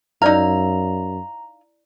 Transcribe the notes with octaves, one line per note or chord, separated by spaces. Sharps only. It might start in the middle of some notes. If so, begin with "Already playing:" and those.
F#2 D#4 E4 D5 F5 A#5 E6